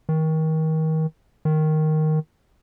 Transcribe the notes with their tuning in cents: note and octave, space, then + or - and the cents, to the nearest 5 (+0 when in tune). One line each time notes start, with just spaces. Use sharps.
D#3 +30
D#3 +0